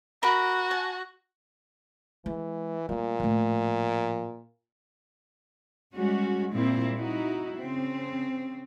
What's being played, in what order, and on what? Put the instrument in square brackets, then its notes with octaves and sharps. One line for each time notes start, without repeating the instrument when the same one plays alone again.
[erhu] F#4 [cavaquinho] A#4 B5 D6
[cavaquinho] F#5 G#5 A5
[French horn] E3 [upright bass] G#3
[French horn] A#2 [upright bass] G3 A3
[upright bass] A2 F3
[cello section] G3 G#3 C#4 F#4
A#2 G3 C4 E4
D#4 E4 F#4
C#3 C4